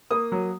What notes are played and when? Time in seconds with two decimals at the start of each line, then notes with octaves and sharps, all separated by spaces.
0.11 A#3 D#6
0.32 F#3